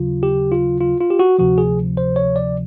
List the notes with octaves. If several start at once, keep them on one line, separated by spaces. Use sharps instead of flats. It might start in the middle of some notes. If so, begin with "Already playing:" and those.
Already playing: D#2 C#3 F#3 F4
G4
F4
F4
F4
G4
F#4
D2 C3 F3 F#4
G#4
C5
C#5
D5